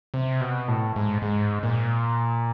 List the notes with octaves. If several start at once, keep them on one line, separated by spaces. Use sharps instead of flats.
C3
B2
A2
G#2
G#2
A#2